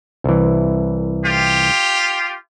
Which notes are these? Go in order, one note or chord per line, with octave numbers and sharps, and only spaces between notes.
C2 E3
F4 G4